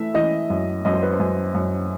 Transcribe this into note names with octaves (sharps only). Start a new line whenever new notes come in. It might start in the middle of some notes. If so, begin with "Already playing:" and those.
Already playing: E3 A3 E5
E3 D#5
F#2
F#2 D#5
C5
B4
C5
F#2
F#2